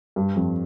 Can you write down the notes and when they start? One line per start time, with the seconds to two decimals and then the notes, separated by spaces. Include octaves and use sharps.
0.16 G2
0.36 F2